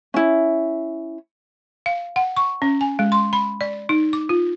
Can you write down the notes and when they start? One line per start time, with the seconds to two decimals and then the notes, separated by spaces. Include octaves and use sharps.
0.14 C#4 E4
1.86 F5
2.16 F#5
2.37 C#6
2.62 C#4
2.81 G#5
2.99 G#3
3.12 C6
3.33 B5
3.61 D5
3.89 D#4
4.13 D6
4.29 F4